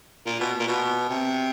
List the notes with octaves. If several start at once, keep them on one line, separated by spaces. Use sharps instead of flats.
A#2
B2
A#2
B2
C3